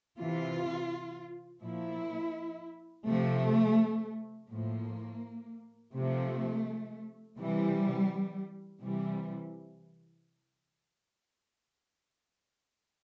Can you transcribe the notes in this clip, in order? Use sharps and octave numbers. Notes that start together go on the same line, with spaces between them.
C3 E3 F4
A#2 F3 E4
C3 F3 A3
A2 F3 A#3
C3 F3 A3
C3 E3 G3
C3 E3 G3